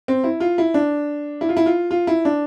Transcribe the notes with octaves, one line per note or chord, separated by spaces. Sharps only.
C4
E4
F4
E4
D4
E4
F4
E4
F4
F4
E4
D4